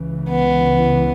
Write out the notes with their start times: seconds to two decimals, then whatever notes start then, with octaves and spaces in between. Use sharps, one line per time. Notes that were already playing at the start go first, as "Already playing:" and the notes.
Already playing: C#2 C#3 E3
0.29 B3